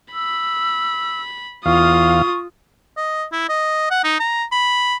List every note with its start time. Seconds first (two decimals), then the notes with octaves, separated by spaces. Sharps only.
0.14 B5 E6
1.66 E2 F4 F5 C#6 D#6
2.97 D#5
3.32 E4
3.49 D#5
3.90 F#5
4.04 D#4
4.20 A#5
4.52 B5